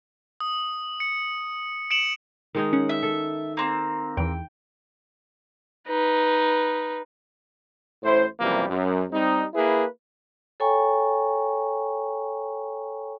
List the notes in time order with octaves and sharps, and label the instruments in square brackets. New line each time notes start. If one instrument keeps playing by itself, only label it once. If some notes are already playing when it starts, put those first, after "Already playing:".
[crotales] D#6
C#7
C#7 D7 E7 F#7
[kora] D#3 G#3 D#4
[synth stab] C#4 [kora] F#5
[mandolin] E5
[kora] A4
[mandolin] A#3 C4
[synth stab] E2 E3 [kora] G5
[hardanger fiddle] D#4 B4
[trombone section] A1 A2 E4 C5
F#2 C3 E3 F3 G3 A#3
F#2
G3 C4 D#4
A#3 E4 G#4 B4
[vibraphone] A4 C#5 G5 G#5 A#5 C#6